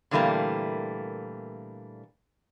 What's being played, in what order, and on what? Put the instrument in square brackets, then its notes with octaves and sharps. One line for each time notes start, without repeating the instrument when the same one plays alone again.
[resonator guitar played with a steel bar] A#2 D3 E3 G3 A3 A#3